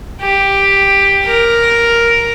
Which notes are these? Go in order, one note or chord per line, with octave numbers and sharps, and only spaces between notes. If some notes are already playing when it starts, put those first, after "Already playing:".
G4
A#4